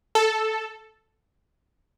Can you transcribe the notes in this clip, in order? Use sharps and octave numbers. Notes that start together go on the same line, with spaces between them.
A4